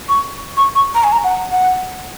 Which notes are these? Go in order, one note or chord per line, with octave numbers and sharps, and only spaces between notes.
C#6
C#6
C#6
A#5
G#5
A#5
F#5
F#5